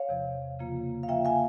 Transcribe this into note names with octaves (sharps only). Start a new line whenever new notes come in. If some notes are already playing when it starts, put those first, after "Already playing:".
Already playing: C#5 F5
E2 C3 F3
C#3 F3 A#3 F4
F5
C#3 F3 A#3 F4 E5 G5
F5 G#5